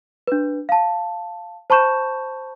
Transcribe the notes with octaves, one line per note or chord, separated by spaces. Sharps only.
D4 B4
F5 A5
C5 A5 B5 C#6 G6 E7